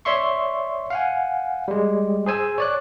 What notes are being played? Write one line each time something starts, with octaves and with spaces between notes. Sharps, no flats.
C#5 D5 E5 C6 C#6
F5 F#5 G#5
G3 G#3
G#4 C5 G#5 E6
C#5 D5 F#6